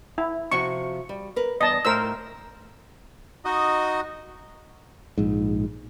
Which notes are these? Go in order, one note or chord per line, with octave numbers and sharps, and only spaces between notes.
E4
C3 F3 F#4 C#6
G3
A#4 B4
E2 G2 D#5 A5
A2 A3 A#4 C5 E6
D#4 F#4 D#5
A#1 G#2